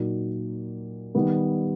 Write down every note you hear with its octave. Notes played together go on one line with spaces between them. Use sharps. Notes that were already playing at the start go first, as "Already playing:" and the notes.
Already playing: A#2 F#3 A#3 D#4
D#3 G3 B3